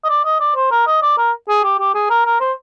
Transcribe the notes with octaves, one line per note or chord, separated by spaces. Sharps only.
D#5
D5
D#5
D5
C5
A#4
D#5
D5
A#4
G#4
G4
G4
G#4
A#4
A#4
C5